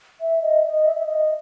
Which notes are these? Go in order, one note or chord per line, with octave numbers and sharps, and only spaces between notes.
E5
D#5
D#5
E5
E5
D#5